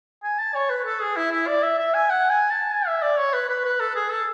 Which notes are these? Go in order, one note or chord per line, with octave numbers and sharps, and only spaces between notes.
G#5
A5
C#5
B4
A4
G#4
E4
E4
D5
E5
E5
G#5
F#5
G#5
A5
G#5
E5
D5
C#5
B4
B4
B4
A4
G#4
A4